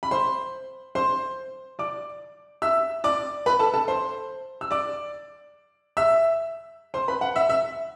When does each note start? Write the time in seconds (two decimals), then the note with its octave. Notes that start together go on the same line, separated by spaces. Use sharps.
0.03 B5
0.11 C5 C6
0.95 C5 C6
1.79 D5 D6
2.62 E5 E6
3.04 D5 D6
3.46 B4 B5
3.59 A4 A5
3.74 A4 A5
3.88 C5 C6
4.61 E6
4.71 D5 D6
5.97 E5 E6
6.94 C5 C6
7.08 B4 B5
7.21 F#5
7.36 E5
7.49 E5